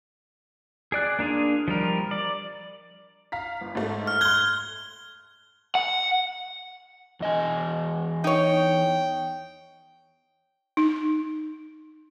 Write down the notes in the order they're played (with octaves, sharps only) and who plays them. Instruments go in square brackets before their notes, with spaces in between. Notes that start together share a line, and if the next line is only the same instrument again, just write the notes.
[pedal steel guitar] G#4 D5 F#6
A#3 D4 F4 G#4
F3 G3 A#4
D5
[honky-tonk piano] F5 A#5 B6
G1
G#2 A3
[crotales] F6
[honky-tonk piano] C6 F#6 [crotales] G#6 G7
[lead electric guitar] F#5
[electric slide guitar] E2 D#5 G#5
[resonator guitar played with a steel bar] D#4 C#5 [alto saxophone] G5
[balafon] D#4